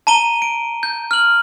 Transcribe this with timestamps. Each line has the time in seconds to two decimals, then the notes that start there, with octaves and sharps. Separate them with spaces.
0.07 A5 A#5 D#7 G7
0.42 D7
0.83 G6
1.11 F6 F#7